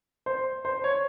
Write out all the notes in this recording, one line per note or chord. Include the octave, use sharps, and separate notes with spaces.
C5
C5
C#5